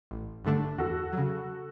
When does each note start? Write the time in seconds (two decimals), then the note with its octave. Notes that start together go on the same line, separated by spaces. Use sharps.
0.11 A1
0.45 G2 D3 A3 D4
0.78 E2 F#4 A4
1.13 C#3 F#3